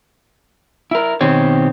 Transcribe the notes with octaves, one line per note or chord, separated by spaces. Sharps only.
E4 A#4
B2 D#3 C4 G4 C#5